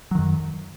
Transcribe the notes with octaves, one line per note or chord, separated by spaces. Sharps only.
F#2 D#3 F#3